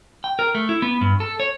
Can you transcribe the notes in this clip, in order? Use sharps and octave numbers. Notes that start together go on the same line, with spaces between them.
G5
A#4
A3
E4
B3
G2
A4
C#5